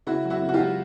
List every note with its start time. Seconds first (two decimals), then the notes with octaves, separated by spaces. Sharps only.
0.07 C#3 E4 F#4
0.25 F#3
0.30 E4 F#4
0.42 C#3
0.49 F#4
0.54 F4 G4
0.60 F#3